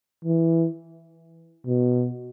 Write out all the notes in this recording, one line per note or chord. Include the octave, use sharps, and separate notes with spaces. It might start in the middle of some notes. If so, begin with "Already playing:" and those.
E3
B2